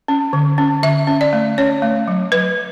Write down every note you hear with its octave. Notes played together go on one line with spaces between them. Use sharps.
C#4
D3
C#4
D3 E5
C#4
D5
A3
C#4 C#5
A3
F#3
F#3 B4